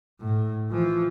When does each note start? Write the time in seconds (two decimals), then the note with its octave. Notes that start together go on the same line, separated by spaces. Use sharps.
0.21 A2
0.71 E3 F3